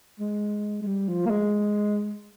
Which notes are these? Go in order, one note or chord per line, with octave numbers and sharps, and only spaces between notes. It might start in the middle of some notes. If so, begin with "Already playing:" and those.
G#3
G#3
G3
F3
A#3
G#3